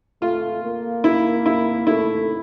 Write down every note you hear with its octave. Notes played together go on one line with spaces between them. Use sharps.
A3 F4
A#3
E4
E4
A3 E4